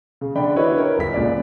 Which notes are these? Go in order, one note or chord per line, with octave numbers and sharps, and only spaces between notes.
C#3
D3 D5 G5 B5
E4 F#4 G4 B4 C#5 D#5
A#4 C#5
G1 B6
C#2 A#2 D5